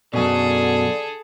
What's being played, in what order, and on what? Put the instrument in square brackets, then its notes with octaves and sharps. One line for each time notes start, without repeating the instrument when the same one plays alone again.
[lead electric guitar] F#2 B2 [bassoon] D3 [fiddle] G#4 A4